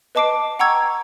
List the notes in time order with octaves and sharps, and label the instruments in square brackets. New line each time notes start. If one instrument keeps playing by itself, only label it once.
[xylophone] B4 D#5 A5 D6 C7 D7
F#5 G5 A#5 C#6 E6 G#6